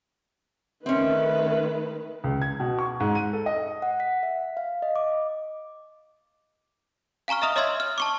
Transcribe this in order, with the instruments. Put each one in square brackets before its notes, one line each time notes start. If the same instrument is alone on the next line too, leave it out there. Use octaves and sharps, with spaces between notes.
[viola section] D#3 A3 B4 [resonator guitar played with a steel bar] C4 C#4 [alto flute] E5
[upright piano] C#2
G#6
B2
C#6
G#2
D#7
A4
D#5
[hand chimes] F#5
B6
E5
F5
D#5
D6
[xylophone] F5 G#5 A#5 C#6 F6
D#5 E5 A#5 D#6 F6 F7
C#5 D#5 E5 C6 E6 G#6
F6
A5 C#6 D6